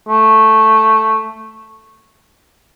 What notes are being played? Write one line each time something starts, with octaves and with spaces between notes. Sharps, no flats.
A3